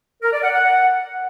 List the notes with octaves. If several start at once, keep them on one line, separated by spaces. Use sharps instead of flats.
A#4
D5
F#5
F#5